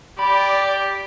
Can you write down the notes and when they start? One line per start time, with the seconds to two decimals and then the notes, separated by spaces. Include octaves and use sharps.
0.19 G4 D5 B5